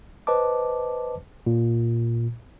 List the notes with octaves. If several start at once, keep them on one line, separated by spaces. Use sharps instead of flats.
B4 C5 D#5 A5 D6
A#2